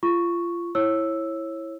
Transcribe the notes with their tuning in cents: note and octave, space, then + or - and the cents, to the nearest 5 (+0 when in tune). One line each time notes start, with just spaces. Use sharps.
F4 -25 C#6 +0
E4 +0 C#5 -25 E6 +0